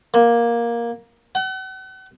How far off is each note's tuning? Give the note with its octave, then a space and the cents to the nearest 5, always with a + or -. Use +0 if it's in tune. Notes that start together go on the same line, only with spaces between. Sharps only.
A#3 +10
F#5 +40